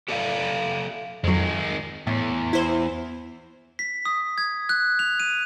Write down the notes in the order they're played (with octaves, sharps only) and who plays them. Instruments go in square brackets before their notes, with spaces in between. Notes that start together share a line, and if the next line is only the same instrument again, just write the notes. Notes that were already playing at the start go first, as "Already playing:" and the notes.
[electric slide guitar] G4 A4 D5 E5 F5
[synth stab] F2 F#3 [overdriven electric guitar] D#3 G#3
[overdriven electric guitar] E2 [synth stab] A2
[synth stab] E4 C5
[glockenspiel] B6
D#6
G#6
F#6
F7
D#7